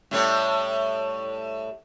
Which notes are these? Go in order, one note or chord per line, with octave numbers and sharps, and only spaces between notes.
A2 G3 C#5